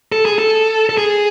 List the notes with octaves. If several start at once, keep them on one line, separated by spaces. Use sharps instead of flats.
A4
G#4
A4
A4
G#4